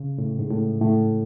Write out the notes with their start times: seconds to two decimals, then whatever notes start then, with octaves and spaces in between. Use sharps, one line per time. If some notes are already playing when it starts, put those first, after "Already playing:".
Already playing: C#3
0.18 A2
0.39 G#2
0.50 A2
0.81 A2